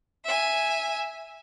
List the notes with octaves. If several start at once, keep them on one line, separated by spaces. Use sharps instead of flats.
E5 G#5